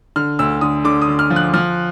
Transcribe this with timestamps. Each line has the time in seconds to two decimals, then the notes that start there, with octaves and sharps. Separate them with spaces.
0.16 D3 F6
0.39 D2 E6
0.61 D3 D#6
0.84 D3 D6
1.02 D#6
1.08 D3
1.19 F6
1.30 F3
1.36 F#6
1.54 F3 F6